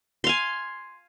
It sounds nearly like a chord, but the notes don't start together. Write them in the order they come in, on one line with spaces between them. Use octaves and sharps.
C6 F5 G#5